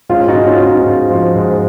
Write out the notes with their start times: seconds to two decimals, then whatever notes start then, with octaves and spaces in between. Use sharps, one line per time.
0.09 G#2 C#4 F4
0.28 D#4 F#4
0.35 G#2
0.47 C#4 F4
0.60 G#2
0.66 D#4
0.85 G#2
1.10 F3
1.35 G#2